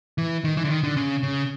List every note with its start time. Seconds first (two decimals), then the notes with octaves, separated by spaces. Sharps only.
0.18 E3
0.44 D#3
0.57 E3
0.64 D3
0.70 D#3
0.84 D3
0.97 C#3
1.23 C#3